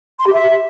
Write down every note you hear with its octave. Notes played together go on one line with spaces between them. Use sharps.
C6
G4
E5